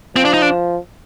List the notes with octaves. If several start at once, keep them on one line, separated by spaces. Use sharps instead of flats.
F3 C4
D4
D#4
D4